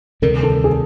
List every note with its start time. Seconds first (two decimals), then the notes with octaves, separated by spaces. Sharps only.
0.22 D2 C3 D#3 G3 A#4
0.43 A4
0.64 G#4